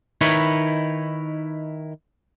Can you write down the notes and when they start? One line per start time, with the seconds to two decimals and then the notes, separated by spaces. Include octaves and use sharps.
0.21 D#3 D#4 E4 B4 C#5